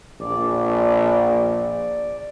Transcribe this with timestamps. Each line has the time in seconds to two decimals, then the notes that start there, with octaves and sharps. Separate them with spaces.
0.20 A#1 D5